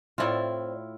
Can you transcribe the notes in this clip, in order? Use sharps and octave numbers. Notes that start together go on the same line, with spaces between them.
A2 C4 E4 F4 D5